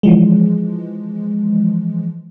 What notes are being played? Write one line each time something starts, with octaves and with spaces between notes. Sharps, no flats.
E3 F3 G#3